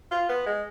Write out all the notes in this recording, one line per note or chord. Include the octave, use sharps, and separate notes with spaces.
F4
B3
G#3